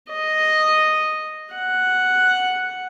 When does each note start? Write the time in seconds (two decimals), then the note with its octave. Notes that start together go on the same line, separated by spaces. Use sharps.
0.12 D#5
1.54 F#5